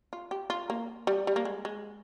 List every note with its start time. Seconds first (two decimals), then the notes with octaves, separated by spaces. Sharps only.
0.13 F4
0.31 G4
0.50 F4
0.70 A#3
1.07 G3
1.27 G3
1.36 A#3
1.45 G#3
1.65 G#3